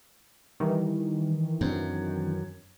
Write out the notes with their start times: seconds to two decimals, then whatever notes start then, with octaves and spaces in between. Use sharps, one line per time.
0.60 D#3 E3 G3 D#4
1.61 F#2 F#3 C4 D4